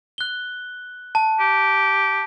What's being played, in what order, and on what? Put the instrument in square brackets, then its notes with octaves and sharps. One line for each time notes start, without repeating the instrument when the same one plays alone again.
[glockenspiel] F#6 G7
A5
[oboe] G4